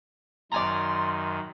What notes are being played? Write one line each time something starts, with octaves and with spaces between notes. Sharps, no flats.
F#2 D#3 D5 G#5 A#5 C6